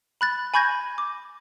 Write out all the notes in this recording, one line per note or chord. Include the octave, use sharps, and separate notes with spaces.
B5 F#6 A6
G#5 B5 C#6 G6 G#6 A#6
D6